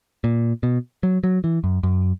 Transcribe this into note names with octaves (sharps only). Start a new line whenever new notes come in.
A#2
B2
F#3
F#3
E3
F#2
F#2